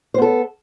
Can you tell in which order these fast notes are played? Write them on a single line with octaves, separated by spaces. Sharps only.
C5 B3 A4